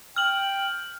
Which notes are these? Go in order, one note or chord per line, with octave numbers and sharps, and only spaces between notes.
G5 F6 F#7